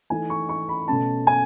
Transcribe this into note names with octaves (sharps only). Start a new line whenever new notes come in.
E3 A3 D#4 G#5
C#6
C#6
B5
B2 A3 C#4 A5
G#5